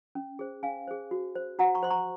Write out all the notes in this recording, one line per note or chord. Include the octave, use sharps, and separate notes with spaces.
C#4
G#4 C5
C#4 F5 G#5
G#4 C5
F#4
C5
F#4 F#5 A#5
A#5 C#6
C5 C6
A#5 C#6